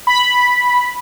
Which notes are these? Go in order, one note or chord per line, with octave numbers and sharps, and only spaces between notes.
B5